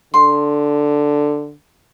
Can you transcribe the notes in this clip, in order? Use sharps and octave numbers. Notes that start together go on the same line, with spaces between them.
D3 C6